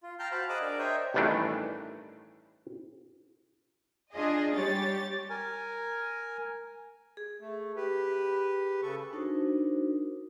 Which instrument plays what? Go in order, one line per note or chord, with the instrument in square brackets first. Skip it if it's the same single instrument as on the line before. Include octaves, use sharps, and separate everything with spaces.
[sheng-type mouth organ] F4
F5 G5 A5 A#5 F6 G6
F#4 C5 F5 A5 B5
G#4 D#5 A#5 D6 E6 F#6
D4 A#4 D5
C5 C#5 D#5 E5 G5 A#5
[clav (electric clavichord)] A1 G2 D#3 E3 A3 D4
[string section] D4 F4 G#4 D#5
G3 G4 C#5 A6
[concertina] A#4 G#5
[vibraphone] G#4
[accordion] A3
G4 B4
C#3 A4 C#6
[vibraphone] D4 D#4 F#4 A#4 C5